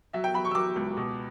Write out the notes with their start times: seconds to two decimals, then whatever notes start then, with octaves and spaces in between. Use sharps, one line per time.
0.13 F#3 E5
0.24 G5
0.34 F#3 B5
0.45 C#6
0.51 E6
0.55 F#3 D6
0.76 C#2
0.97 B2